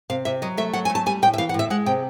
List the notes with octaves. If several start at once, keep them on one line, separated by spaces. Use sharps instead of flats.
C3 F5
C3 E5
F#3 D#5
A3 E5
F#3 F#5
G#5
A3
A5
G3 G#5
A2 G5
E5
E3 F5
F#5
A2 E5
G#3 F#5
C3 G5